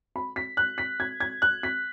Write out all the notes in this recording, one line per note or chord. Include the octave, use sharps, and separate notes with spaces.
B5
B6
F#6
B6
G#6
G#6
F#6
B6